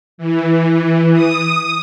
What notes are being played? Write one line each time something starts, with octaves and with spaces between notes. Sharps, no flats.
E3
D#6